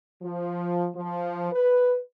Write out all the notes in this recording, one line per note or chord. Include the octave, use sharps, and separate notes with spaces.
F3
F3
B4